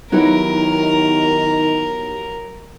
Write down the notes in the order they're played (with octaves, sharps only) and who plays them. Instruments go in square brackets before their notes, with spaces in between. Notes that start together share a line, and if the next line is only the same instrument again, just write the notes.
[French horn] D#3 [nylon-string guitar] F#3 E4 [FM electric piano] B3 D#4 G4 [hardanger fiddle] A#4